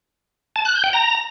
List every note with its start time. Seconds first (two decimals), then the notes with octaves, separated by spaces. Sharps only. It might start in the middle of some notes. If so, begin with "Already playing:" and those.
0.56 A5
0.65 F#6
0.74 G6
0.84 G5
0.93 A#5